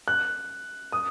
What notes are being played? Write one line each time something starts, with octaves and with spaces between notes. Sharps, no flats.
F#6
D#6